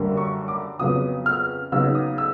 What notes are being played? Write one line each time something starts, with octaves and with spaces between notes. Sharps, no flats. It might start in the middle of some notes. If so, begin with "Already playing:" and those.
Already playing: F#2 D3 G3 A#3
C#6
D6
F2 C#3 F#3 B3 D#6
F6
C#3 F#3 B3 D#4 E6
D#6
E6